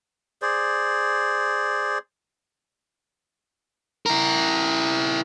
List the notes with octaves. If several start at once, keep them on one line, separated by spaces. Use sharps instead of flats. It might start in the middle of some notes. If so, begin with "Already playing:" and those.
G#4 C5 D5
E4 A#4